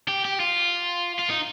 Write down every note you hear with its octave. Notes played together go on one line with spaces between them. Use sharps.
G4
G4
F4
F4
D#4